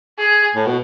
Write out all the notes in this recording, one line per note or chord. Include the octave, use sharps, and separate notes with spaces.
G#4
A2
B2